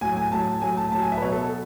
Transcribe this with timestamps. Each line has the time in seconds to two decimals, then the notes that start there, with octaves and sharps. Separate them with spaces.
0.01 A2 F#3 G#5
0.17 G#5
0.31 A2 F#3 A5
0.62 A2 F#3 G#5
0.77 A5
0.92 A2 A5
0.95 F#3
1.02 G#5
1.12 E5
1.18 B4
1.22 B2 F#3 C#5
1.32 A4
1.42 A4